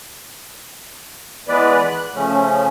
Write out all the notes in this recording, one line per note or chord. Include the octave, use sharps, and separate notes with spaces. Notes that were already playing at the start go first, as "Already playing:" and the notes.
E3 G#3 B3 B4 D5
F#6
C#3 F3 A3 C#4